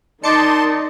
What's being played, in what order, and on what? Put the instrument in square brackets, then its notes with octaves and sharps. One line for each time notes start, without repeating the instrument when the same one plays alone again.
[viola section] D#3 D#4 [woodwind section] D5 D#5 [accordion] A5 C6 [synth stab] D6 C#7